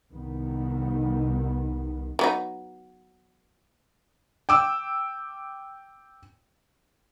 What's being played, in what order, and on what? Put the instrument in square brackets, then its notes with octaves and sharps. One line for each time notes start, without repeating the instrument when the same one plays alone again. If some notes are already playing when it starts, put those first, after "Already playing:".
[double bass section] C2 D#3 B3
[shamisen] F#3 B3 D#4
[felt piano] G5 D6 E6